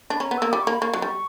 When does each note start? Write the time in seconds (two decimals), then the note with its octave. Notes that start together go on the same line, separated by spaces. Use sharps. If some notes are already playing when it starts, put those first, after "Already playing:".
0.10 D4
0.16 B5
0.20 C#4 A#5
0.31 B3
0.37 A#3 E6
0.52 G3 D6
0.63 A#3 C#6
0.71 B5
0.81 A#3 C#6
0.94 F#3
1.02 G3